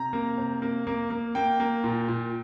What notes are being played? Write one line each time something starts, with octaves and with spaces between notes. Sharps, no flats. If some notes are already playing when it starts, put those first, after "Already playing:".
Already playing: C3 A#5
A#3
C3
A#3
A#3
A#3
A#3 G5
A#3
A#2
A#2